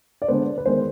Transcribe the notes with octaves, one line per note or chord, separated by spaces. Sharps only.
D5
D3 G#3 B3 C5
B4
D#3 G#3 B3 C5